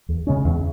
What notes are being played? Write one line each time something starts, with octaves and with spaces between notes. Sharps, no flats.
E2
C#3 G#3 C#4
E2